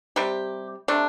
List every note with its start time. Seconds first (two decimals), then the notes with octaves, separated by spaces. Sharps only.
0.16 C3 G3 G4
0.88 C3 A3 D4